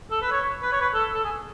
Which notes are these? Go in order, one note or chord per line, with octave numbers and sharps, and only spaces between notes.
A4
B4
C#5
B4
C#5
B4
A4
A4
G#4